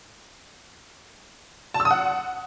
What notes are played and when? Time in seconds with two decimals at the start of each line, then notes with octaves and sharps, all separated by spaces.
1.74 A5
1.80 E6
1.85 D#6
1.91 F#5